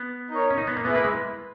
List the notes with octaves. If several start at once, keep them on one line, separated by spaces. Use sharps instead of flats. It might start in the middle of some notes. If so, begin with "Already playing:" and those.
Already playing: B3
D#4 A#4 C#5
C#4
D#4
B3
A#3
B3 E4 G#4 B4
A#3
G#3